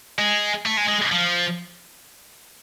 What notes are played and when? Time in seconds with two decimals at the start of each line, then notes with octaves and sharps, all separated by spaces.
0.19 G#3
0.66 A3
0.77 G#3
0.89 G#3
1.12 F3